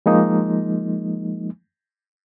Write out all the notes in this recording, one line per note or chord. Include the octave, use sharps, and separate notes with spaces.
F3 G#3 A#3 D#4